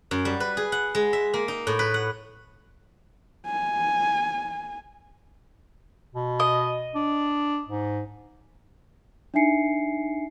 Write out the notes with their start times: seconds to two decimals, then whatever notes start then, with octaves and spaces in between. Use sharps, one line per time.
0.11 F#2
0.25 G3
0.40 B4
0.57 G#4
0.72 F#5
0.95 G#3
1.13 E5
1.34 A#3
1.48 D#4
1.67 A2
1.79 B4
1.94 F#5
3.47 G#5
6.15 B2
6.40 D#5
6.95 D4
7.69 G#2
9.34 D4 D#4 E5 G#5 C7 C#7